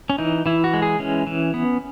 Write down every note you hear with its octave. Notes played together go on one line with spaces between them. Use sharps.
C#4
E3 D#4
E3 E4
F#4
G#3
G#4
E3 C#4
E3
B3